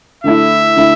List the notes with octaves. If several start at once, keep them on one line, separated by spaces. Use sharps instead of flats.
D3 A3 E4 E5
D3 A3 E4